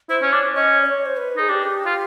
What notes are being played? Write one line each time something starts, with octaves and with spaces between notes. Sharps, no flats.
E4 C5
C#4
D4 C#5
C#4 D#5
D5
C#5
C5
B4
D#4 G#4
D4 G4
F4